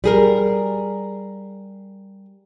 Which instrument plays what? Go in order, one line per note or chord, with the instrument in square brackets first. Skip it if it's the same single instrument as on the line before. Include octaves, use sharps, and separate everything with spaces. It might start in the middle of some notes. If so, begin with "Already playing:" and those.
[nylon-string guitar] G3 G#4 A#4